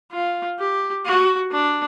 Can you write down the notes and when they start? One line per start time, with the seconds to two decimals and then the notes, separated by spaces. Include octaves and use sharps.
0.12 F4
0.60 G4
1.05 F#4
1.52 D4